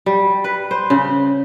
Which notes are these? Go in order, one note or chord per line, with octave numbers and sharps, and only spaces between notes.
G3
B4
C5
C#3